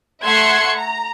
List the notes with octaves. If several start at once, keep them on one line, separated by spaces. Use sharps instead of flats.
A3 E5 F#5 C6 G#6 C#7
A#5